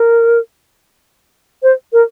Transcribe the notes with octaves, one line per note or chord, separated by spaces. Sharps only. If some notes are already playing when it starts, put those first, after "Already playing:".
Already playing: A#4
C5
A#4